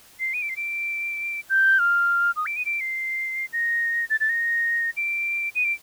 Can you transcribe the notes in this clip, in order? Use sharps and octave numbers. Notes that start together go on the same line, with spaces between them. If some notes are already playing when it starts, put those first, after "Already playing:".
C7
D#7
D7
C7
D7
G6
F6
D#6
D7
D#7
D7
C7
A#6
A6
A6
A#6
D7
D#7
D7